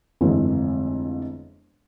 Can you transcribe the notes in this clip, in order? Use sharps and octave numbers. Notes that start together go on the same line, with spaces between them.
G1 F2 E3 G#3 A3 E4